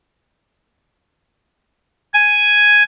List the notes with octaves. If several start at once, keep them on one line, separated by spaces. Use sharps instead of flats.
G#5